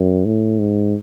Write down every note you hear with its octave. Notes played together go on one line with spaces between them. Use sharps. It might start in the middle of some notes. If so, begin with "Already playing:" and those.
Already playing: F#2
A2
G#2